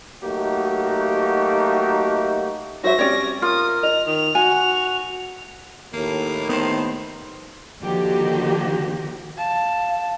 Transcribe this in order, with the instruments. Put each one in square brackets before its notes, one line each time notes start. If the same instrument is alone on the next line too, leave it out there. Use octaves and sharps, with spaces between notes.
[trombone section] F#3 A3 A#3 D#4 F#4 G4
[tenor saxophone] F#3 [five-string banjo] F#4 C5 E5 [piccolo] A#6
[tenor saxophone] G3 [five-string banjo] C4 C#4 [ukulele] C#5 D5
[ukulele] F4 [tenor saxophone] A#4 [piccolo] D#6
[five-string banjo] D#5 [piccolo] F7
[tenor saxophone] D#3 [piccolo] F7
[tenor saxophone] F#4 [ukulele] G#5
[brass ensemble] D#2 A2 [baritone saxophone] A#3
[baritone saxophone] D#3 [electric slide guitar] B3 C5
[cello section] D3 D#3 F3 A#3 F#4 G4
[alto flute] F5 [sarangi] A5